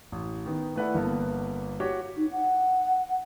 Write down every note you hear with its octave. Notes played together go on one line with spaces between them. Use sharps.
A1
D#3 B3
A3 E4 B4 D5 F#5
G1 A#3 B3 A4
F#4 G4 C#5
D#4
F#5